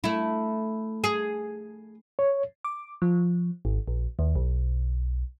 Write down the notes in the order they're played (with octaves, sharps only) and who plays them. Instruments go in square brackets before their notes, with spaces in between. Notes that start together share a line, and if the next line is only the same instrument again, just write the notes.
[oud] A3 E4
G#4
[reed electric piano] C#5
[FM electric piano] D6
F3
G#1
A#1
D#2
B1